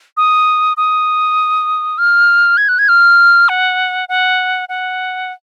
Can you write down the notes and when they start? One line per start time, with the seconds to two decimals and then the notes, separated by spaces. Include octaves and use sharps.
0.17 D#6
0.77 D#6
1.98 F6
2.57 G#6
2.69 F#6
2.79 G#6
2.88 F6
3.49 F#5
4.09 F#5
4.69 F#5